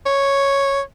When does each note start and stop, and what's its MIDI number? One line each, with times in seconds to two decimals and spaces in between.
0.06 0.81 73